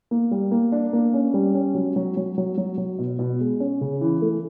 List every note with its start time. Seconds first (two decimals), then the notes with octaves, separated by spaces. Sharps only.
0.11 A#3
0.31 G3
0.51 A#3
0.72 D4
0.93 A#3
1.14 C#4
1.34 G3
1.54 C#4
1.75 F#3
1.96 F#3
2.17 F#3
2.38 F#3
2.58 F#3
2.78 F#3
2.99 B2
3.19 B2
3.41 G#3
3.60 C#4
3.81 C#3
4.01 E3
4.22 A3